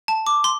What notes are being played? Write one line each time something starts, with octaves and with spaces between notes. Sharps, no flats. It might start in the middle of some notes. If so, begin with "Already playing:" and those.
A5
D6
C6